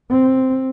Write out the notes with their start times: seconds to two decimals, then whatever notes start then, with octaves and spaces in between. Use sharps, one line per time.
0.10 C4